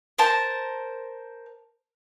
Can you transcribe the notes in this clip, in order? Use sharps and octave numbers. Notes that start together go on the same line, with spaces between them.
A#4 C5 A5